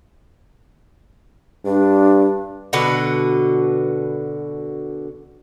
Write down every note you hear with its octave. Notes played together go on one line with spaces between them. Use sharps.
G2 D4
B2 D3 F#4 B4